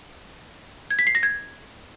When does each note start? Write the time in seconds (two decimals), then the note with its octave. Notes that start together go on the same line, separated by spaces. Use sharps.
0.91 G#6
0.99 B6
1.07 C7
1.15 A#6
1.23 G#6